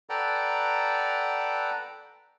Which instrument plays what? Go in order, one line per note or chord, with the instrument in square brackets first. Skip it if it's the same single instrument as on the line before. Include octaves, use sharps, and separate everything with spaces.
[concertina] A4 B4 D5 F#5 G5 A#5